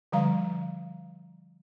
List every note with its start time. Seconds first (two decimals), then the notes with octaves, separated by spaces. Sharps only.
0.12 D3 F3 G3 F5 A#5